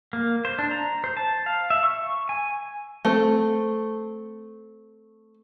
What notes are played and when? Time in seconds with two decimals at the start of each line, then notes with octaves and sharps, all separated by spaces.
0.13 A#3
0.45 C5
0.59 D4
0.71 A#5
1.04 C5
1.17 A5
1.46 F5
1.70 E5
1.83 C#6
2.29 G#5
3.05 A3 C4